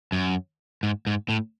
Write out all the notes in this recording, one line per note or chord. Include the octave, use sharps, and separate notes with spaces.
F#2
G#2
G#2
A2